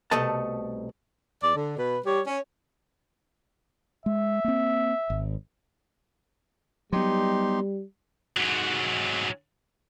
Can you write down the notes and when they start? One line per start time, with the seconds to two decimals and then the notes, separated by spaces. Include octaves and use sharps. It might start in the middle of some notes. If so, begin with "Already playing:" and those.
0.11 C2 B2 A3 A4 D#5 A5
1.42 E2 D5
1.55 D3
1.78 B2 B4
2.05 G3 G4 C#5
2.27 C#4
4.06 G#3 E5
4.44 A#3 C4
5.10 G#1
6.93 F#3 G3 B3 D#4 G4 C6
8.37 G#2 F#3